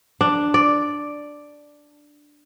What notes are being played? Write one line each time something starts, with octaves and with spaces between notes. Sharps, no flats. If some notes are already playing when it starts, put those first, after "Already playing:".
D4
D5